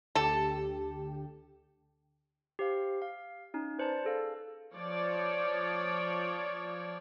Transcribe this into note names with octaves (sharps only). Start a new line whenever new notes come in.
D2 D3 G4 A4
G4 C5 F5
F5
C#4 D#4
B4 C5 D5 A5
G#4 A4 F5
F3 C#5 D5